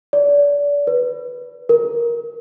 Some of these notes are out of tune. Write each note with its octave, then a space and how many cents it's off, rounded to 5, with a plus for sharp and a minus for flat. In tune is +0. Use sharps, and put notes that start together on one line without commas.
D5 -30
B4 +0
A#4 +15